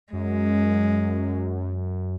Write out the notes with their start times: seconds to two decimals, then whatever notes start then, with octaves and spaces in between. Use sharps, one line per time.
0.13 F#2 G#3